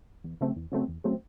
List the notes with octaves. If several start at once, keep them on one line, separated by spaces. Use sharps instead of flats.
E2
C#3 F#3 A3 C4
E2
C#3 F#3 A3 C4
E2
C#3 F#3 A3 C4